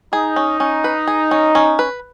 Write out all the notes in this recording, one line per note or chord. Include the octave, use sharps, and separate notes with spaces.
D#4 G#4
C#4
C#4
B4
G#4
C#4
C#4
B4